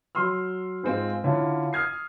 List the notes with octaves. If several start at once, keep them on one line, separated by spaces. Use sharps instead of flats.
F#3 C6 E6 F6
G#2 G#3 C4 F4
D3 C#4 E4 F4
D#6 F6 G#6 C7